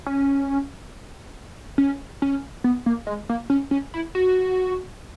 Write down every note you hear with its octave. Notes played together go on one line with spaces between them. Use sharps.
C#4
C#4
C#4
B3
A#3
G#3
A#3
C#4
C#4
E4
F#4